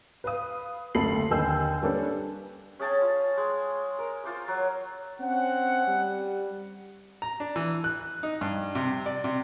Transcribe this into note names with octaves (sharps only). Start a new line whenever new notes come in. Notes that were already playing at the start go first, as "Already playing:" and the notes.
B4 F5 D#6
F#1 D2 A4 B5 C7 F#7
D#2 D3 D#5 G#5 E6 G6
G3 A#3 C#4 D4 A4 B4
C#4 G#4 G5 A5
F4
G#3
A#4
F4 C5 D6
F#3
C4 C#4 F#5
G3
A#5
D4
E3
F#6
D#4
G2
C3
D5
C3